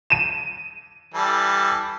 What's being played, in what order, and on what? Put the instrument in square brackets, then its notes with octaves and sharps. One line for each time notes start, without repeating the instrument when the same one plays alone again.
[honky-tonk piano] D#7 E7
[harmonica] E3 G3 A4